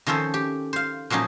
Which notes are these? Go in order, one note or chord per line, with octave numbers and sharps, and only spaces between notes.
D#3 F3 C#4 A4 C5
G4
C5 F5
A#2 F3 F#3 C#4 D#4